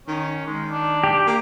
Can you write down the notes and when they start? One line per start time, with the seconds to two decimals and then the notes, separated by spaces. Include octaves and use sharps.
0.07 D#3 C#4
0.46 D#3 G#3
0.70 D4
1.04 G4
1.27 A#3